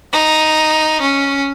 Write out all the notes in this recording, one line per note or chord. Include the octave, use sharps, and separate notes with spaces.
D#4
C#4